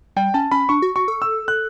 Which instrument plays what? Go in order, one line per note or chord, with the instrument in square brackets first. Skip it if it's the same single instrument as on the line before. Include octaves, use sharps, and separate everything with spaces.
[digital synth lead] G3 [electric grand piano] G5
[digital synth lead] C#4 [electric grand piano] A5
[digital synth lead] C#4 [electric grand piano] B5
[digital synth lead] D4 [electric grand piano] C#6
[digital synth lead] F#4
[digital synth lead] F#4 [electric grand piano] C#6
[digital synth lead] A4
[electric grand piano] E6
F#6